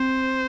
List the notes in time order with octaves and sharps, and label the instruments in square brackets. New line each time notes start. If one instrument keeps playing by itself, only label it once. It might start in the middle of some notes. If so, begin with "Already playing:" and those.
Already playing: [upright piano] C4 [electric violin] C5